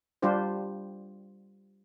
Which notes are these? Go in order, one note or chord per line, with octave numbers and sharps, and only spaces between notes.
G3 D4 F4 G4 C5